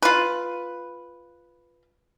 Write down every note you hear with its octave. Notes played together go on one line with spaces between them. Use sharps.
F4 B4